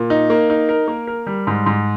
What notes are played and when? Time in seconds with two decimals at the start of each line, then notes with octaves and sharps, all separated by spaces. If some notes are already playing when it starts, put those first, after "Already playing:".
Already playing: A#2
0.10 D#4
0.30 A#3
0.50 D#4
0.69 A#4
0.88 A#3
1.07 A#4
1.26 G3
1.47 G#2
1.66 G#2